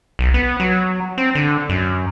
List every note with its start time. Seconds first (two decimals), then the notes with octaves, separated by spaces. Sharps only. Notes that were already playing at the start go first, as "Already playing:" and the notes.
0.19 B1
0.34 B3
0.60 F#3
1.18 C4
1.35 D3
1.69 F#2